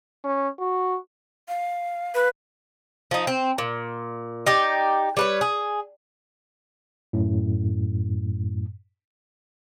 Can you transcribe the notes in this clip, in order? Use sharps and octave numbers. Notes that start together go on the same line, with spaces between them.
C#4
F#4
F5
B4
F3 D#4
C4
A#2
D#4 G4 D5
G3 B4 C#5
G#4
F#2 A2